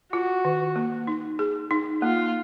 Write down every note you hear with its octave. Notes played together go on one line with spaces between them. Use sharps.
F4 F#4
D#3
A#3
D#4
G#4
D#4
A#3 F4